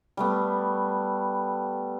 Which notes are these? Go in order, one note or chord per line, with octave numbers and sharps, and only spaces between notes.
G3 A3 B3